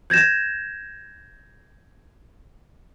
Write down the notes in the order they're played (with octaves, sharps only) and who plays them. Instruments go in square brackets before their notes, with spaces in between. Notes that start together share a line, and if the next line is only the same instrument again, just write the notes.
[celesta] G6 G#6 A#6 E7